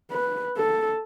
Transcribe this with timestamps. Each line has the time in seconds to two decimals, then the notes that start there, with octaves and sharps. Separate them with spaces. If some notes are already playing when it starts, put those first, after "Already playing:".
0.11 B4
0.57 A4